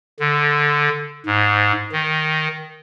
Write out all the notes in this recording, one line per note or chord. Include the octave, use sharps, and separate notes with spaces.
D3
G#2
D#3